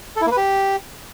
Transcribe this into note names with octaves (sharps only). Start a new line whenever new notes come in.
A4
E4
A#3
B4
G4